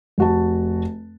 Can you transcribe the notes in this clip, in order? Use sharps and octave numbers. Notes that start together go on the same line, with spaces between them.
F1 F#4 A5